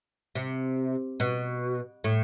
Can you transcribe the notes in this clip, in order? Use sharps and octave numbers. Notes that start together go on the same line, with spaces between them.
C3
B2
A2